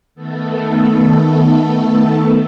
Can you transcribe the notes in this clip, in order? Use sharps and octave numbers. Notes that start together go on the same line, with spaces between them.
D#3 A3 B3 A4